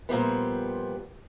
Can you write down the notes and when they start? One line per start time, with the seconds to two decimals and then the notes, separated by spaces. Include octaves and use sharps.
0.09 A#2 F3 G3 B3